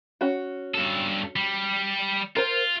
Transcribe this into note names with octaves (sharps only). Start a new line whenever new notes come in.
C#4 F#4
G2 A4
G3
F4 A#4 C5